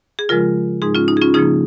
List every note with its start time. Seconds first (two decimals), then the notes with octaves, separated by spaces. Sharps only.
0.19 G#4
0.29 C#3 F3 G#3 F4 A#4
0.82 G#2 G#3 D#4 G#4
0.95 C#4 F4
1.08 D#4
1.17 G#4
1.22 C#4 F4
1.34 C#3 F3 A#3 D#4 G#4